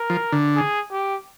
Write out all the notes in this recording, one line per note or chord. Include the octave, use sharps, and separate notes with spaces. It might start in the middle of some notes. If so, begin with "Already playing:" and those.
Already playing: A#4
F3
D3
G#4
G4